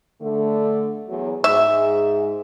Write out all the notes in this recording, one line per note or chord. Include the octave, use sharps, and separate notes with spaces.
D3 A3
E2 F#3
G#2 E5